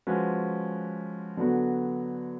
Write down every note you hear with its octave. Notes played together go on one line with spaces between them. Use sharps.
F3 G#3 C#4 F#4 B4
D3 F#3 B3 F#4